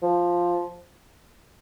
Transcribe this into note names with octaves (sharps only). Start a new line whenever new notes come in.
F3